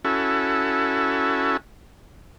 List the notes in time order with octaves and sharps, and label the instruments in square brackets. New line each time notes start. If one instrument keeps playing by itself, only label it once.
[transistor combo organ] C#4 E4 F#4 A4